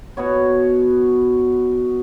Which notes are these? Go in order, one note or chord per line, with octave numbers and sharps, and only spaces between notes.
B2 B3 F#4 C#5